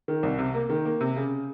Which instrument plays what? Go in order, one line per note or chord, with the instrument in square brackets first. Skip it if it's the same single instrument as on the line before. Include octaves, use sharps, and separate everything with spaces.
[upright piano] D#3
C2
C3
A#3
D#3
A#3
C3
C#3